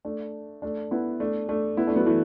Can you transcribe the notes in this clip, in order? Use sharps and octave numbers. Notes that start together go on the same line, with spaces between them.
A3 D4
A3 D4
B3 E4
A3 D4
A3 D4
B3 E4
A3 D4
F#3 B3
E3 A3